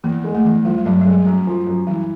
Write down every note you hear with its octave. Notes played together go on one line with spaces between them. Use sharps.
E2 A#3
G#3
A3
E2
F3 G3
G3
G2 F#3
F#3
G3 G#3
F#2 F#3
F3
F#2
E3 G3